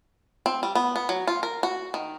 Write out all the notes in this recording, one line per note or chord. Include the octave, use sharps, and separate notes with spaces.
C4
G3
B3
B3
F#3
F4
A#4
F#4
D#3